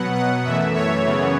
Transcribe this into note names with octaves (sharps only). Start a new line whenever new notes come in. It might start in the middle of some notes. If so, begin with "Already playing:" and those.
Already playing: B2 F#3 B3 F#5
F#5
F#2 E3 A3 E5
C#5
F#2 C#3 E3 B3